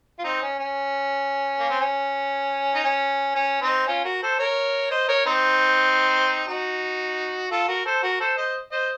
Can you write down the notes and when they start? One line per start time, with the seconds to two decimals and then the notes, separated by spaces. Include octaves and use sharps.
0.19 F4
0.24 C4 D#4
0.42 C#4
0.59 C#4
1.59 A#3
1.70 C4
1.79 C#4
2.75 D#4
2.84 C#4
3.35 C#4
3.62 C4 D#4
3.87 C#4 F4
4.04 F#4 A#4
4.23 A4 C5
4.39 A#4 C#5
4.91 C5 D#5
5.08 A#4 C#5
5.26 C4 D#4
6.47 D#4 F#4
7.51 F4 A4
7.68 F#4 A#4
7.85 A4 C5
8.03 F#4 A#4
8.20 A4 C5
8.37 C5 D#5
8.71 C5 D#5